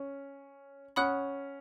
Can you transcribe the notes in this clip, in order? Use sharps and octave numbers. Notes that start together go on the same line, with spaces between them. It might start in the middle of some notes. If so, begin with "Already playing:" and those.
Already playing: C#4
C#4 F#5 B5 D#6 F#6